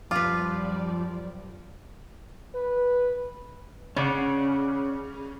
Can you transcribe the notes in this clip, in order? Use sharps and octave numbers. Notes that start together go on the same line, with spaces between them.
F#2 F3 G3 F4 B4 D5 D6
B4
C#3 C#4 D5 F#5